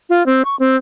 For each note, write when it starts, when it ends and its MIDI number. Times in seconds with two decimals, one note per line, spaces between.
0.10 0.25 65
0.26 0.42 60
0.45 0.56 85
0.59 0.76 60